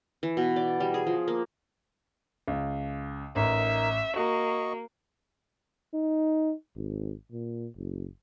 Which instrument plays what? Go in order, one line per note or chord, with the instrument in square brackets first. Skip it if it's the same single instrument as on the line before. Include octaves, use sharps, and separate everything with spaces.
[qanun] E3
B2
D5
G3
G#4
F3
A#3
[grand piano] C#2
[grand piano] A1 [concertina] D#4 A#4 [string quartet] E5
[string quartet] A#3 [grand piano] F#4 [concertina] D#5 C#6
[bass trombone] D#4
G#1
A#2
F#1